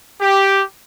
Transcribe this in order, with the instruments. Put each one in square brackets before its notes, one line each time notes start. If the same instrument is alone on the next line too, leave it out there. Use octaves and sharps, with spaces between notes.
[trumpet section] G4